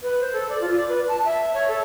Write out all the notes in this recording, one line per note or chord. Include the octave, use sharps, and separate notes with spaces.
B4
C5
A4
D5
F4
D5
B4
A5
E5
C#5
A4